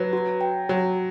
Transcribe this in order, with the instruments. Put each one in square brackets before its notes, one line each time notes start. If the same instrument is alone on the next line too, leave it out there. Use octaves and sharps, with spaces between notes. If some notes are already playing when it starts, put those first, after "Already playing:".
Already playing: [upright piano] F#3 [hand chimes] B4
[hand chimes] F#4
G5
[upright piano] F#3 [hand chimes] F#4